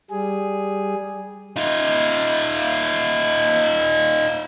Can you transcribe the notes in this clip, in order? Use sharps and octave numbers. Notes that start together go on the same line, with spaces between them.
G3 G#4
D#4 F4